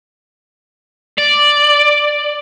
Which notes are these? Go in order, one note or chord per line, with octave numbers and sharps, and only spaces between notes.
D5